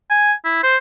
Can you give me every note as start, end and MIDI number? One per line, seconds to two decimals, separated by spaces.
0.10 0.33 80
0.45 0.60 64
0.63 0.77 72